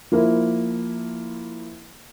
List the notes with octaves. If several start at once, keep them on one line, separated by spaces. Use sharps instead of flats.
F3 A#3 E4